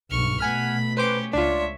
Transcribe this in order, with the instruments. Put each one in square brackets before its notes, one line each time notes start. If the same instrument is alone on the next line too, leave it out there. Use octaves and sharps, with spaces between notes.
[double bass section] B1 G2 [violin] C#6 F6
[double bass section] B2 A3 [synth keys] F#5 G#5 F6 [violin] B5
[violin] C#4 G4 [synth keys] B4 C5 D6
[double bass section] C#2 [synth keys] D4 F4 [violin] C#5 E5